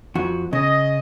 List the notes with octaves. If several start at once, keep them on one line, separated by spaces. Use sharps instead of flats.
F2 F#4
C#3 D#5